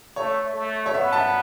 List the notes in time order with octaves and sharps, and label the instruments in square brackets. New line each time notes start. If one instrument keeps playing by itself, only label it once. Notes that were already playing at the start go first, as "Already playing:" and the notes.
[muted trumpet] A3 [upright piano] C#5
[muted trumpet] A3
[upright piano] C#5
[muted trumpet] B3 [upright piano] E5
[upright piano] A5